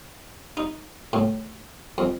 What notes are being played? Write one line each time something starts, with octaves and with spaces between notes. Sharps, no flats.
D#4
A2
F2